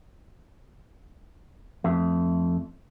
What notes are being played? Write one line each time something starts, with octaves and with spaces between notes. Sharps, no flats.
F2 A3